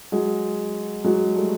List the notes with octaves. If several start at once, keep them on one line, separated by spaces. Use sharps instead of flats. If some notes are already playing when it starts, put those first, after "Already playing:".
F#3 G#3
F#3 G#3
G3 A3